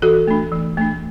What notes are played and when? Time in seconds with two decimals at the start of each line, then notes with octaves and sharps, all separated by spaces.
0.02 E3 F#4 A4
0.28 A3 D4
0.52 E3
0.77 A3 D4